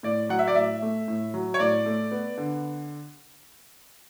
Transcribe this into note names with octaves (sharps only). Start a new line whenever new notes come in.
A2 D5
F#3 F#5
E5
D5
A2 E5
A3
A2
F#3
C#5
A2 D5
A3
B3
D3